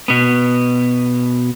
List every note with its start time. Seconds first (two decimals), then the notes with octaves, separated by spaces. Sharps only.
0.08 B2 B3